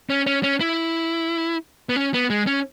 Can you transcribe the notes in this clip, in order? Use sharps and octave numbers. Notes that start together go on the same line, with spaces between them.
C#4
C#4
C#4
E4
B3
C#4
B3
G#3
C#4